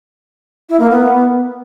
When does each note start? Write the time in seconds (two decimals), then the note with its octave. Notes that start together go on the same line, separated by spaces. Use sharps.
0.69 E4
0.80 A#3
0.90 B3